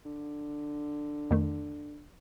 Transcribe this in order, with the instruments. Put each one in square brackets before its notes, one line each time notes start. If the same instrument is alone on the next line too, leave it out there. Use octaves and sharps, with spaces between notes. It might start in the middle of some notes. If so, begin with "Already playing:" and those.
[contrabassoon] D3
[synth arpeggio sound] F2 D#3 A3